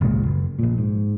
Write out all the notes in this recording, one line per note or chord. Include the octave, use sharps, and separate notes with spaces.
G#1 C#2 A#2 G#3
F#1
A#1 A#2
G#2